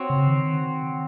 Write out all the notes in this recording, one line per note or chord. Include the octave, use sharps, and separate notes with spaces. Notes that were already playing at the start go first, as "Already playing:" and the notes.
Already playing: C4 F#4 C#5
C#3
D#3